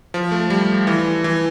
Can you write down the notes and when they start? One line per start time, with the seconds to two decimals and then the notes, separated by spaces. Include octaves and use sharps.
0.14 F3
0.31 A3
0.50 G3
0.87 E3
1.24 E3